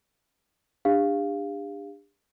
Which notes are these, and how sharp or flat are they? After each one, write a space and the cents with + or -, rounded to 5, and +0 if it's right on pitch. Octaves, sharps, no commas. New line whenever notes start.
D4 +15 G4 +45 F5 +0